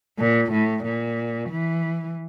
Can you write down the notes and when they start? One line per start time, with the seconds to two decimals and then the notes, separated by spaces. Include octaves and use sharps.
0.19 A#2
0.52 A2
0.84 A#2
1.50 E3